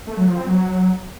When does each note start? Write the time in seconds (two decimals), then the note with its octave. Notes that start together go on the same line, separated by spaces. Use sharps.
0.07 A3
0.17 F#3
0.27 F3
0.37 C4
0.47 F#3